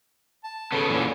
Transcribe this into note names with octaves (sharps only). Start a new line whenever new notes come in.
A5
C#3 B3 A4
A#2 D3 E3 C#4